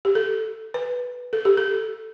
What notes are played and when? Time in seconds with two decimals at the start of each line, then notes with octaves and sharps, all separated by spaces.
0.05 G4
0.15 A4
0.74 B4
1.33 A4
1.45 G4
1.57 A4